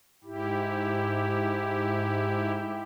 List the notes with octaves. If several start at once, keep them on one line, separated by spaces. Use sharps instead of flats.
G#2 E4 G4